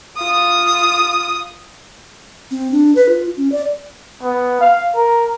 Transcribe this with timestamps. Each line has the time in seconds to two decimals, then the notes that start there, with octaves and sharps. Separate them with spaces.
0.17 F4 D#6
2.51 C4
2.72 D4
2.96 B4
3.09 F4
3.37 C#4
3.52 D5
4.23 B3
4.61 F5
4.95 A#4